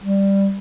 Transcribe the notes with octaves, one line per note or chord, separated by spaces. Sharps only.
G3